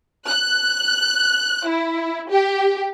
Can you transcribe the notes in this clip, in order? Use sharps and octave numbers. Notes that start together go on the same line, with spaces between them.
F#6
E4
G4